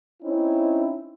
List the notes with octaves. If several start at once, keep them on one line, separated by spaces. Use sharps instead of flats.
C4 C#4 D#4 E4